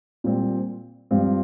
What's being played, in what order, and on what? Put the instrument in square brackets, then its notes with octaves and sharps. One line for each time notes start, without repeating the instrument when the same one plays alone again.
[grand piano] A#2 G3 C4
G2 F3 C4 F4